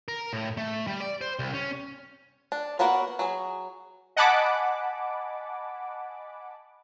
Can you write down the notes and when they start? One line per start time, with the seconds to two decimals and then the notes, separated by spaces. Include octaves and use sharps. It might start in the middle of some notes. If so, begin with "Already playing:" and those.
0.08 A#4
0.33 A2
0.57 A3
0.87 G3
1.00 D5
1.21 C5
1.39 C2
1.54 C#4
2.52 D4
2.79 A#3 B3 F#4 A#4 C#5
3.19 F#3 G#4
4.16 D#5 F#5 G#5 A5 B5 D6